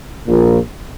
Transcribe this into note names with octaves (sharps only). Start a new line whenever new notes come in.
A#1 A#2